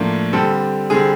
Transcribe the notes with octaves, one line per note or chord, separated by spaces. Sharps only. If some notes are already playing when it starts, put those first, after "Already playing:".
Already playing: A2 F3 A#3 D4
D3 G3 C4 A4
D3 G3 C4 G#4